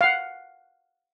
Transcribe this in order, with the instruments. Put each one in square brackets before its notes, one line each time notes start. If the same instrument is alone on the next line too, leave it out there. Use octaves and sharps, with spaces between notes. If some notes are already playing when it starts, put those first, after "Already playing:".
[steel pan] F5 F#5